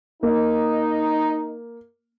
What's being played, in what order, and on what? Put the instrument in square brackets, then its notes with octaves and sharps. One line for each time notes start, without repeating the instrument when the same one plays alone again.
[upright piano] A#3 [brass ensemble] D#4